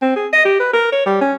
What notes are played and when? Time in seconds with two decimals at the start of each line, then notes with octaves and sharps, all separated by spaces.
0.02 C4
0.16 G#4
0.33 D#5
0.45 G4
0.60 B4
0.73 A#4
0.92 C#5
1.06 G3
1.21 C#4